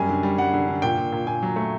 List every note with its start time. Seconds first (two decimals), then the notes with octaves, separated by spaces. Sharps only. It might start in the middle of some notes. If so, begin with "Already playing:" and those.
Already playing: F#2 G3 G#5
0.09 D3
0.23 G3
0.38 G3 F#5
0.53 D3
0.68 D3
0.82 A#2 G5
0.97 A#2
1.12 A#2
1.27 A#2 G#5
1.43 F#3
1.56 A3